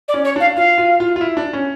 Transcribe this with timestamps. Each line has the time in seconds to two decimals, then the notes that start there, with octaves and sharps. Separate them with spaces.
0.08 D5
0.14 C#4
0.25 C#5
0.36 D4 F5
0.57 F4 F5
0.78 F4
1.00 F4
1.16 F4
1.21 E4
1.37 D4
1.53 C#4